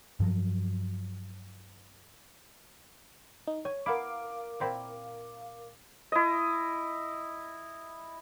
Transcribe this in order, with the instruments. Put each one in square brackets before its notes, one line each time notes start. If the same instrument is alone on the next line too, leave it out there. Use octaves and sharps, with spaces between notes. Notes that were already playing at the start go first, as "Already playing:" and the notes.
[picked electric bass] G2 F3 F#3
[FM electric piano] D#4
[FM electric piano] C#5 [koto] G#5
[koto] B3 E4 [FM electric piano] A#4 F5 D6
[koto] A#2 C4 E4
[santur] E4 D#5